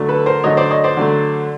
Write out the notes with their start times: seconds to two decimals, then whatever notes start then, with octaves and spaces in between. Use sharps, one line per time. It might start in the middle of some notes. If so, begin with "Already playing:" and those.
Already playing: D3 F#3 A3
0.09 A4 B4
0.26 A#4 C5
0.44 D3 F#3 A3 C#5 D#5
0.57 C5 D5
0.71 C#5 D#5
0.84 C5 D5
0.97 D3 F#3 A3